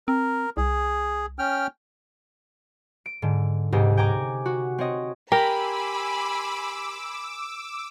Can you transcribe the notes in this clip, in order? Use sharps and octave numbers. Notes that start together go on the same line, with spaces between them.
C4 A#4
C2 G#4
C#4 G5 F6
D7
G#2 D3
C#2 G#2 C3 G4 D#5
G5 G#5 A#5 D6
F#4
C4 C#5 D#5
G4 A#4 G#5 B5 C6 D6 E6